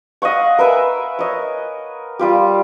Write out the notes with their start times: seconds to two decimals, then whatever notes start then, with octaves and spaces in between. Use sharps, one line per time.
0.22 D#5 F5 F#5 C#6
0.58 A#4 B4 E5 G#5
1.19 C#5 D#5
2.19 G3 F4 G4